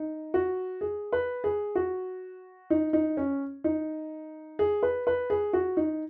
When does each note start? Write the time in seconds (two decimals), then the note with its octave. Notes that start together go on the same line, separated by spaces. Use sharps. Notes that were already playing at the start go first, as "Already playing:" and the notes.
Already playing: D#4
0.34 F#4
0.81 G#4
1.13 B4
1.44 G#4
1.75 F#4
2.70 D#4
2.93 D#4
3.17 C#4
3.64 D#4
4.59 G#4
4.83 B4
5.07 B4
5.30 G#4
5.53 F#4
5.77 D#4